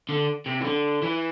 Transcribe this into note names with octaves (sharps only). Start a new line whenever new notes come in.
D3
C3
E3
D3
E3